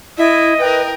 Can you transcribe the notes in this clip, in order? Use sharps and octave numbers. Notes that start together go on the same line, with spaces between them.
E4 D#5 E5
A#4 B4 G5